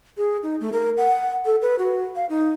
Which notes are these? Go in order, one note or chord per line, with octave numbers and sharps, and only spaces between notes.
G#4
D#4
A3
A#4
F#5
A4
B4
F#4
F5
D#4